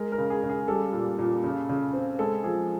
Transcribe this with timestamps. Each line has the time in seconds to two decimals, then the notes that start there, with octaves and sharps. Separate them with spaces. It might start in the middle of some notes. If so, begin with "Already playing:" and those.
Already playing: G#3 A#4
0.12 A#4
0.18 C#3
0.30 G#4
0.43 C#3
0.49 G#4
0.68 G3 A4
0.93 A#2
1.18 A#2
1.44 C#3
1.69 C#3
1.93 C4
2.19 G#3 A4
2.44 F3 G#4